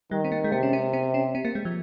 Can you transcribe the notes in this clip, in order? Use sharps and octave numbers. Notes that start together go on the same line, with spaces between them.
D#3 G3
C4
A#3
G#3
C3 A#3
C#4
C4
C4
C#4
C4
A#3
G#3
F3